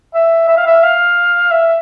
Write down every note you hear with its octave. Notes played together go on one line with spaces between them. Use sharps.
E5
E5
F5
E5
F5
E5